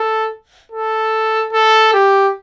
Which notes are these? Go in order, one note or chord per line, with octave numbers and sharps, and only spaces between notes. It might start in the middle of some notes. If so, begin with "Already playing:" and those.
Already playing: A4
A4
A4
G4